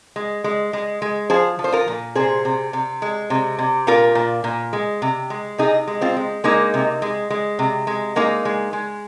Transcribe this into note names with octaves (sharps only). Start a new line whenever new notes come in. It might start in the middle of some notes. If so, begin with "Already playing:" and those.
G#3
G#3
G#3
G#3
F3 G#4 C5
F3
C5
F4 A#4
A#2
C3 G#4 C5
C3
C3
G#3
C3
C3
A#2 F4 A#4
A#2
A#2
G#3
C3
G#3
C3 D#4 G#4
G#3
C4 F4
G#3
G#3 A#3 D#4
C3
G#3
G#3
C3
G#3
G#3 A#3 D#4
G#3
G#3